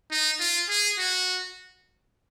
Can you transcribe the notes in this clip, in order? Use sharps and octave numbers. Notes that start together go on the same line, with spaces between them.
D#4
F4
G#4
F#4